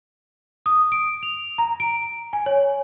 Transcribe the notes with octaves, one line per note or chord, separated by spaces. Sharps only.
D#6
D7
F7
A#5
D7
G#5
C#5